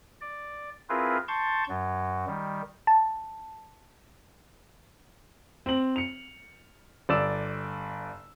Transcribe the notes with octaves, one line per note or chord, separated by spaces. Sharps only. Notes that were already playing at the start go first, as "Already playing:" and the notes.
D5
C4 E4 F4 G#4 A#4 B4
A5 C6 C#6 G6 A6
F#2 F#3
D#3 G3
A5
C4 F#7
C#7 F7
G1 D5 E6 E7